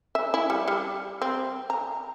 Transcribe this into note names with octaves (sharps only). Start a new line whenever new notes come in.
E5
E4
G3
G3
C4
A#5